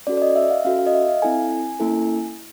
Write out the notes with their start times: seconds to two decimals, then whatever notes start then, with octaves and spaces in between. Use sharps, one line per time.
0.07 C#4 F#4 A4 D5
0.17 D5
0.22 D#5
0.36 E5
0.51 F5
0.65 C#4 F#4 A4 F5
0.79 F5
0.86 D#5
0.94 E5
1.08 F5
1.22 C4 E4 A4 G#5
1.80 A#3 C#4 E4 A4